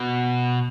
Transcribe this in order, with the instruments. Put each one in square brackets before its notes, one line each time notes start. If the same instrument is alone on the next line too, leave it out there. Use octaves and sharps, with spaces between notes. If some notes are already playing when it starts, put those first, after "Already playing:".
Already playing: [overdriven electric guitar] B2